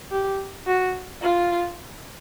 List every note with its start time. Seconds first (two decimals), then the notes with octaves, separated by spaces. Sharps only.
0.11 G4
0.67 F#4
1.22 F4